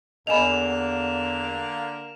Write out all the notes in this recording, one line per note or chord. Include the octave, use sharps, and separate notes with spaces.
E2 D3 A#3 D#5 G#5 B5 E7 F7